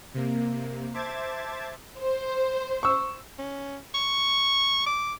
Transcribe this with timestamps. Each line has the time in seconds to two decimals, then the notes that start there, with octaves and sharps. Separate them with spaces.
0.14 C3 A#3
0.94 C5 E5 A5 D6 G#6 A6
2.00 C5
2.83 C#6 E6
3.39 C#4
3.94 C#6
4.86 D6